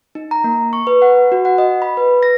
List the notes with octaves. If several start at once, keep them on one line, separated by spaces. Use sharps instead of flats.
D#4
A#5
A#3
C#6
B4
F#5
F#4
F#5
D#5
B5
B4
A#6